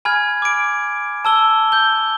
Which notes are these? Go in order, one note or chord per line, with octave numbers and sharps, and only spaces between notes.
G#5 B5 F6 G#6
D6 D7
A5 E6 G7
G6 G7